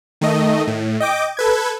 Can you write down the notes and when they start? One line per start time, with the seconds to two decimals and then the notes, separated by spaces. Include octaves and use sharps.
0.21 D#3 A3 D#5
0.67 A2
1.00 D#5 G5 D6
1.37 A4 B4 G#6